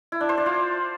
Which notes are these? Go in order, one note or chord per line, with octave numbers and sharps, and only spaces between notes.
E4
D4
C5
D5
F4